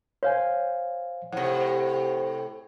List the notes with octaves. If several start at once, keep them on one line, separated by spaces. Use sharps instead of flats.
C5 C#5 F5 G#5
A2 C3 C5 F#5